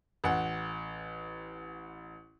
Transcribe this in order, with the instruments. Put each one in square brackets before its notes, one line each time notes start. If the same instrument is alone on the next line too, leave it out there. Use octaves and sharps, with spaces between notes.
[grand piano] A1 F#5